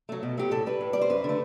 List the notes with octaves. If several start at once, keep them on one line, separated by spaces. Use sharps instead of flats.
F#3 A3
B2
F#3 A3 G4
A2 A4
G3 B4
A2
G3 D5
C5
F#2 B4
D3
A3